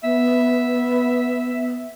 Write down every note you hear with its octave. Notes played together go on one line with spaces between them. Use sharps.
B3 E5